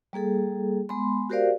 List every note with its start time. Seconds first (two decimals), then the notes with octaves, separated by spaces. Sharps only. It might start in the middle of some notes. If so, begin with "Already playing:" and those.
0.13 G3 A#3 G#4 A4
0.89 G#3 B3 B5 C6
1.30 F#4 G4 A#4 C5 D5 F5